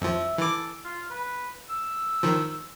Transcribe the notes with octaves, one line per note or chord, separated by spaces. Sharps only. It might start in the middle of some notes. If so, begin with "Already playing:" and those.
F2 F3 E5
E3 A4 D6
F4
B4
E6
D#3 F3